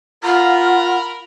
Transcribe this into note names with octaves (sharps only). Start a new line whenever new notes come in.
F4 A#4 F#5 A#5 B5